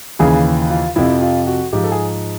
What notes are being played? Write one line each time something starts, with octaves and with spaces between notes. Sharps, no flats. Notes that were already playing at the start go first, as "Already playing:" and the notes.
D#2 C#3 E3 G#4
F4
F2 C3 F3 E4
F4
F#4
G#2 F3 G4
A4
G#4